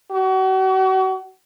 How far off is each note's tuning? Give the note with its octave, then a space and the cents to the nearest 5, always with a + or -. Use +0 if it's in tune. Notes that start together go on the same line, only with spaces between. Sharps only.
F#4 +35